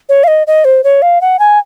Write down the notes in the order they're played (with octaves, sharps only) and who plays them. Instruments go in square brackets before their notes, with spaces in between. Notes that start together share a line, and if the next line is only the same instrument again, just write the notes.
[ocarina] C#5
F5
D#5
D#5
C5
C#5
F5
F#5
G#5